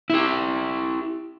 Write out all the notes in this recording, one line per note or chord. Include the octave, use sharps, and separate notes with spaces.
E4 G4